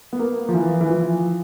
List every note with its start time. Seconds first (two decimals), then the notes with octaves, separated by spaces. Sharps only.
0.13 B3
0.19 A#3
0.49 F3
0.54 E3
0.81 E3
0.90 F3